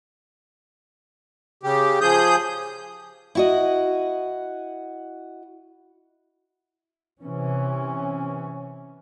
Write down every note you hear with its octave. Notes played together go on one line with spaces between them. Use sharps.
C#3 G4
F3 G#4 D#6 G6
E4 F#4 D#5
C3 E3 C#4